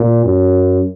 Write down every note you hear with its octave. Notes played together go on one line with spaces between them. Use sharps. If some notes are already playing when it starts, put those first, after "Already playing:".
Already playing: A#2
F#2